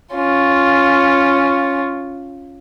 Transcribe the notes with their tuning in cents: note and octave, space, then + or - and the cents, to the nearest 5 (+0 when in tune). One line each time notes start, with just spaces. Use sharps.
C#4 +0 F4 +0